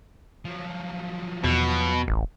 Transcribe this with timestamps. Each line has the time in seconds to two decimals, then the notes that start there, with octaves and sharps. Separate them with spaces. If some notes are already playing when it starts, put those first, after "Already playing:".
0.45 F3 F#3
1.44 E2 B2
2.08 D#1 A1